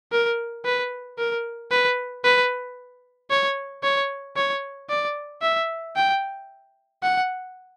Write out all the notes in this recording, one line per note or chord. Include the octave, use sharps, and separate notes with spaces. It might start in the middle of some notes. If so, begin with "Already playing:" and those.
A#4
B4
A#4
B4
B4
C#5
C#5
C#5
D5
E5
G5
F#5